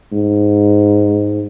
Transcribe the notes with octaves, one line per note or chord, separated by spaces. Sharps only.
G#2